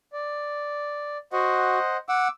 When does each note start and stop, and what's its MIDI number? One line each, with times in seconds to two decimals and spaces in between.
0.13 1.18 74
1.32 1.79 66
1.32 1.97 72
1.32 1.97 75
1.32 1.97 78
2.09 2.28 78
2.09 2.30 86
2.09 2.30 88